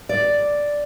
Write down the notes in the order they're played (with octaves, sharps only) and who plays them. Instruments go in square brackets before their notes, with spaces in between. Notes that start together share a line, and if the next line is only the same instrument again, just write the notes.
[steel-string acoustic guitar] D5